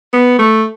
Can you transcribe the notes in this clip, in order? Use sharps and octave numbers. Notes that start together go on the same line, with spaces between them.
B3
A3